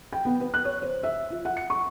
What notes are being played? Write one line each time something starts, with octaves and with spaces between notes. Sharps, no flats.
G5
B3
B4
F#6
C#5
C5
E5
F4
F#5
C#7
C#6